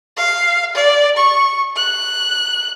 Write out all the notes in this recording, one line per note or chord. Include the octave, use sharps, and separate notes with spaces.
F5
D5
C#6
F#6